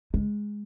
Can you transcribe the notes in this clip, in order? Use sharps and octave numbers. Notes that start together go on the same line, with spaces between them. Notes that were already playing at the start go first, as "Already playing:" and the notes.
G#3